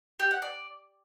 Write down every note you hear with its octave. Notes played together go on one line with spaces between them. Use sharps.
G4
F#5
D5